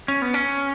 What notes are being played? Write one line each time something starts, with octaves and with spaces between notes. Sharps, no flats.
C#4
B3
C#4